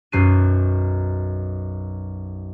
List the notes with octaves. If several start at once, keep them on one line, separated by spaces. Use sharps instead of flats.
B1 F#2 F#3 C7 D#7